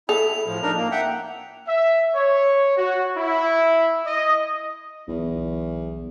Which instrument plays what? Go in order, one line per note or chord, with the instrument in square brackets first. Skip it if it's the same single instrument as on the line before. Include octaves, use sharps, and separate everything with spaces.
[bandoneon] E4 [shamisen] A4 [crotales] F7
[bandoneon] A2 F3
D4 D#4 A#4
A#3
E5 F#5 G5
[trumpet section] E5
C#5
F#4
E4
D#5
[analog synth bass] B1 [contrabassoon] E2